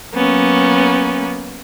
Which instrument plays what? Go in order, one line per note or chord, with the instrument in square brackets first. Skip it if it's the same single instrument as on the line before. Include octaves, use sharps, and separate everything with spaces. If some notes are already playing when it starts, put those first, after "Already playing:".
[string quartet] F#3 A#3 B3 C#4